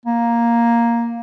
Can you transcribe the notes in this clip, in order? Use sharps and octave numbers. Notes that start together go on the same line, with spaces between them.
A#3